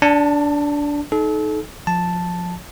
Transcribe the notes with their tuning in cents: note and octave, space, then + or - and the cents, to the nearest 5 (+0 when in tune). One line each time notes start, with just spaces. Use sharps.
D4 -15 A5 +25
D#4 +0 A4 -35
F3 +20 A5 +0